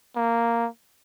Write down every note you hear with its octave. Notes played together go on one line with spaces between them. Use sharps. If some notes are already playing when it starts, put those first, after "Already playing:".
A#3